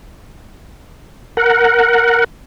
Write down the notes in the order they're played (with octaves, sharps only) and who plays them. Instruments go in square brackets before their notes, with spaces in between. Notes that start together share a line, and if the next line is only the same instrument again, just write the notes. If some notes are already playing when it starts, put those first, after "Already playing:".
[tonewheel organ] A#4 F#5